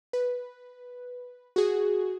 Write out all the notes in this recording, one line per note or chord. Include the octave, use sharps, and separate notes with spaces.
B4
F#4 G#4